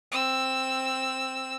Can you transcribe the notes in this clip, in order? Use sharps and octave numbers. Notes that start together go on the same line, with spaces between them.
C4 E6